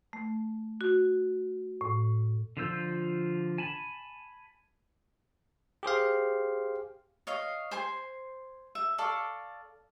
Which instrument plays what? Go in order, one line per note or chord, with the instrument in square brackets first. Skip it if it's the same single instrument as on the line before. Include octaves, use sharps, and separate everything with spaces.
[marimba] A3
F#4
A2
[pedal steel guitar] D3 F3 F4 E6 G6
G#5 A5 B5
[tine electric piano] G4 G#4 C5 F5
[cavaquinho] C#5 D#5 F5
C5 G#5 C6
E5
A4 D5 F5 C#6